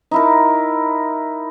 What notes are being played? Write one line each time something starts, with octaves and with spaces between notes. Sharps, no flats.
D#4 E4 A#4